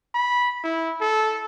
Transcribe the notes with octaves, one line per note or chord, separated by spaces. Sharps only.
B5
E4
A4